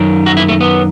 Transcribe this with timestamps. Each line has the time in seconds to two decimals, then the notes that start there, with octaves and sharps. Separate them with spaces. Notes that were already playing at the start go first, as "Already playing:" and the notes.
Already playing: F#2 D#3
0.26 F#4
0.37 E4
0.48 A3
0.60 B3